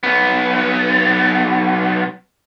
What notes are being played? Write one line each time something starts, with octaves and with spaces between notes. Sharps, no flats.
B1 B3